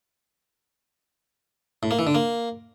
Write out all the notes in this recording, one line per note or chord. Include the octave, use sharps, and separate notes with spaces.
A2
A#3
E3
D3
A#3